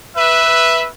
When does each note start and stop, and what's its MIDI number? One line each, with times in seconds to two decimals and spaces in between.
0.17 0.88 71
0.17 0.88 76